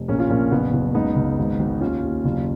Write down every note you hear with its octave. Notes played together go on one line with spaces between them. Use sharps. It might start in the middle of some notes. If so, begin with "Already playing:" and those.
Already playing: F1
A#1 A#3 C#4
C#4 F4
A#1 A#3 C#4
F#1 B3
F#1
C#2 B3 D#4
C#2
G#1
G#1
D#2 C#4 F4
D#2
F#1